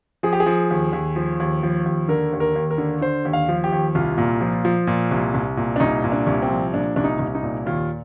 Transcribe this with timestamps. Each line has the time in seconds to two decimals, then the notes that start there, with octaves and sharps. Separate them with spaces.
0.23 F3 G#4
0.33 G4
0.40 G#4
0.46 F3
0.70 D#2
0.93 D#2
1.16 F3
1.40 D#2
1.63 F3
1.85 D#2
2.09 D3 A#4
2.33 D#2
2.40 A#4
2.55 D#2
2.71 A#4
2.78 D3
3.01 D3 C5
3.25 D#2
3.33 F5
3.49 F3
3.64 G4
3.72 D#2
3.95 C2 F4
4.18 A#2
4.41 F3
4.65 F3
4.87 A#2
5.11 C2
5.34 C2
5.57 A#2
5.76 D4
5.80 C2 D#4
6.04 A#2
6.12 D4
6.27 C2
6.42 C4
6.50 F3
6.74 A#2 D4
6.96 C2 D4
7.04 D#4
7.19 C2
7.35 D#4
7.43 A#2
7.66 D#2 F4